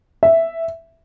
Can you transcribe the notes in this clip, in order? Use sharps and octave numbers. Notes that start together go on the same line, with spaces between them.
E5